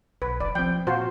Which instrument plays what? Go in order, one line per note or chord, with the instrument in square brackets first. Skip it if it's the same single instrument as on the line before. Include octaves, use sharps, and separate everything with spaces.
[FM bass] B1 [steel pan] B4
[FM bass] F1 [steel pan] D5
[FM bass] F3 [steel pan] C4 G5
[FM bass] A#2 [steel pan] F4 F#4 C5